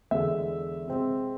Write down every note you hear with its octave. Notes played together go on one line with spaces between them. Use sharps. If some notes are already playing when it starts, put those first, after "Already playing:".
E2 D3 G#3 B3 E5
C3 G#3 C4